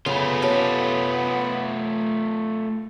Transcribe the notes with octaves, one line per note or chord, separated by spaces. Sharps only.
C#3 A3 B3 F4
C#4 G4 A4